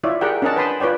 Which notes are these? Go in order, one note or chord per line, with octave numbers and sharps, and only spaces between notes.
E4 F4 C#5 D5 E5
G4 G#4 A#4 D5 F#5 G5
C#4 D4 A#4 D#5 F#5 A5
B4 G5 A5 B5 C6 D#6
F4 B4 C#5 D5 G5